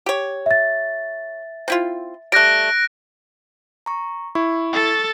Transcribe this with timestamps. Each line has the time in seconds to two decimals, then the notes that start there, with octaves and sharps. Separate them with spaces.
0.06 G4 C#5
0.46 E5 A6
1.68 C4 E4 F4
2.32 G3 A3 F#6 A#6 D7
3.86 A#5 C#6
4.35 E4 C#6
4.73 A4 A6